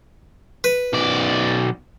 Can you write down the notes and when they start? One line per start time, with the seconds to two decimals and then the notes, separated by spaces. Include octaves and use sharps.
0.64 B4
0.93 B1 D5